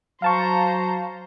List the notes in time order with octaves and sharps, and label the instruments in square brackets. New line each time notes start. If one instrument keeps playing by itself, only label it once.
[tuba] F#3 [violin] C5 A#5 [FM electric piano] F5 A5 C#6